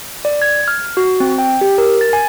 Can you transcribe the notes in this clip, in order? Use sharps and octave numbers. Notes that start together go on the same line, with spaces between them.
D5
G#6
F6
F#4
C4
G5
G4
A#4
A6
G#5